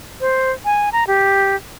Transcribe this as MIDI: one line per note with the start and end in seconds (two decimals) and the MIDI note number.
0.21 0.52 72
0.65 0.89 80
0.93 1.04 82
1.07 1.56 67